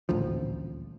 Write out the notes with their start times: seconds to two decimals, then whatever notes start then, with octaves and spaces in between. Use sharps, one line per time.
0.09 D#1 A1 D2 F3